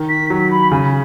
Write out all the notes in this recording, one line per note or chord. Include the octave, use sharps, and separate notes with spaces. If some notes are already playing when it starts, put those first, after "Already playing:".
Already playing: D#3
B6
F#3 B6
B5
C#3 G#5